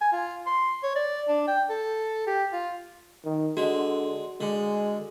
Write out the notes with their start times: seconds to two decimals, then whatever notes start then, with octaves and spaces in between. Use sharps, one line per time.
0.01 G#5
0.12 F4
0.46 C6
0.83 C#5
0.95 D5
1.28 D4
1.47 G5
1.69 A4
2.27 G4
2.53 F4
3.25 D#3
3.57 D3 G#3 F#4
4.41 D3 G#3